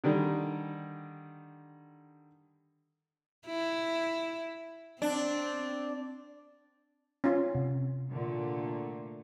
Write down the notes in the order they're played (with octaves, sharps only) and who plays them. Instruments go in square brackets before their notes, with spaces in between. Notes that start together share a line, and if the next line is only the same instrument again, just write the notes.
[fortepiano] D3 D#3 G3
[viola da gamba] E4
[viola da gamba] C4 [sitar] D4
[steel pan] C#4 F4
[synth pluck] C3
[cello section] A#2 D3 A3